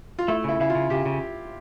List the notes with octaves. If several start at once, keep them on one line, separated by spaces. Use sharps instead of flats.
F4
A3 E4
C#3 E4
C#3 E4
F4
C#3
C#3 G4
C#3